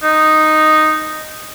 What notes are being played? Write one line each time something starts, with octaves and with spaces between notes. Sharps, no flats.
D#4